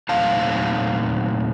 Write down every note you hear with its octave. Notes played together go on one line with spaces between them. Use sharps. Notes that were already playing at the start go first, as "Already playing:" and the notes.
A#2 F#3 A3 C4 D#4 F5 A5